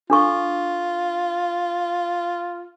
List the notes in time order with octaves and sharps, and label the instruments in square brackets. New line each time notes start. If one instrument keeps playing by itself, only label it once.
[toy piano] D4 A4 C#6 [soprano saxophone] F4